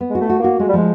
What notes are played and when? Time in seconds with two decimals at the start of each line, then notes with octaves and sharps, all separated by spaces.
0.01 B3
0.10 G#3 F#4
0.20 A3
0.30 F#4
0.40 A#3 F#4
0.59 G#3 A3
0.68 G3
0.73 F3 G#3